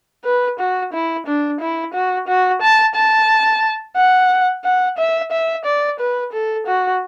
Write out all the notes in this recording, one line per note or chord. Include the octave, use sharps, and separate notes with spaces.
B4
F#4
E4
D4
E4
F#4
F#4
A5
A5
F#5
F#5
E5
E5
D5
B4
A4
F#4